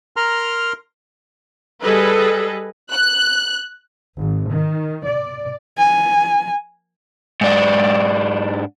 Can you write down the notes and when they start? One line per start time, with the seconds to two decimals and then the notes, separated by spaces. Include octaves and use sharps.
0.17 A#4 A#5 C6 F6
1.81 G3 G#4 A4 B4 D#5
2.92 F#6
4.18 G#1
4.48 D#3
5.06 D5
5.77 G#5
7.41 G#2 D4